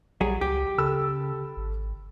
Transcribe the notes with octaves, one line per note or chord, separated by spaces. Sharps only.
A#1 F#3 G3 G#4
C#2 G4
C#3 A4 B5 E6
G#1